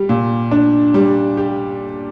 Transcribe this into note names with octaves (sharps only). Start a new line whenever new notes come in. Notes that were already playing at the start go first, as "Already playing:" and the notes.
Already playing: G3 G4
A#2
D4
G3
G4